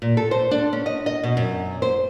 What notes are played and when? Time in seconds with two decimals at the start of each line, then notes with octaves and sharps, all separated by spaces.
0.02 A#2
0.17 A4
0.31 C5
0.51 D4
0.73 C#4
0.86 D#5
1.06 D#5
1.23 B2
1.37 F#2
1.82 C5